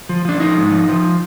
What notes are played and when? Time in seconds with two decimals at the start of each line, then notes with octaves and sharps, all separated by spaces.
0.09 F3
0.25 F3 D4
0.40 F3 D#4
0.57 G#2
0.72 F3
0.88 F3